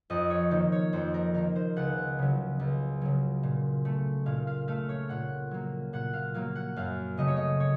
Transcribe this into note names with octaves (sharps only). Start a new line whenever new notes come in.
F2 D#5
C#5
D#3 A#3 C5
C#5
F2 C5
A#4
D#3 A#3 A#4
C5
C#2 F#5
C#3 F#3
C#2
C#3 F#3
A#2
A3
A#2 F5
F5
A3 F5
C#5
A#2 F#5
F#3 A#3
A#2 F#5
F5
F#3 A#3 F5
F#5
F#2 F5
C#3 F#3 A3 D#5
C#5
D#5
C#5